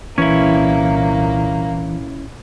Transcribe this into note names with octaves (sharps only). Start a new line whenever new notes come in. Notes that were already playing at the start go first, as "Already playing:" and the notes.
C2 A#2 E3 A#3 C#4 E4 G#6